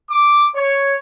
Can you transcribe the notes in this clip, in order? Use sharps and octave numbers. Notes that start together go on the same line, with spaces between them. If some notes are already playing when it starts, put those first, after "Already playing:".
D6
C#5